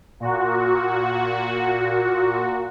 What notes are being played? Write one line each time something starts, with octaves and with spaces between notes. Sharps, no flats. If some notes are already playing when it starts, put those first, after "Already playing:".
A#2 F#4